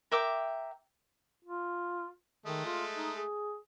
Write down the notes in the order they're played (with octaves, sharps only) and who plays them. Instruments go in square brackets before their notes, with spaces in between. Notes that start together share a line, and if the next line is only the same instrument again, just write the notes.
[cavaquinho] A#4 E5 G5 D6
[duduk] F4
[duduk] D#3 [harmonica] G#3 A3 D#5
[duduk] F4
D#4
G#4